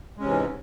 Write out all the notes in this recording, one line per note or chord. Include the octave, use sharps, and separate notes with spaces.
G#2 C3 E3 G#3 C#4